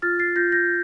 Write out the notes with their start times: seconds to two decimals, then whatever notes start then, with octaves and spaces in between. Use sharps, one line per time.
0.02 F4 F6 A6
0.19 A6 C7
0.36 F4 G6 A#6
0.52 G6 A#6